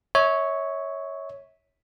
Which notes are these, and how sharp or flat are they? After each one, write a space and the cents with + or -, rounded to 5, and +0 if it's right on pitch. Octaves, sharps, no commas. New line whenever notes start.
C#5 +0 E5 -35